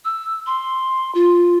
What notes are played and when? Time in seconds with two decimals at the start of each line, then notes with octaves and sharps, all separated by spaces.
0.05 E6
0.46 C6
1.15 F4